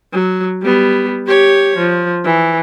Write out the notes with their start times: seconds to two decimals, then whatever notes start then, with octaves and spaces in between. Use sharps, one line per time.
0.13 F#3
0.62 G3 B3
1.27 G4 C#5
1.78 F3
2.25 E3